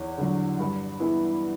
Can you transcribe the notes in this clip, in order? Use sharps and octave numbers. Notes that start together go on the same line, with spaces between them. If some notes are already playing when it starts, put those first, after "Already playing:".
Already playing: E2 C#5
D3 F#3
G2
E3 B3 E4